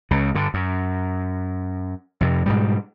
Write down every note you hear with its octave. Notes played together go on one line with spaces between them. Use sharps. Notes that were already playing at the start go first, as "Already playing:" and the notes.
C#2 C#3
G2 D3
F#2
F2 C3
G#2 B2 G3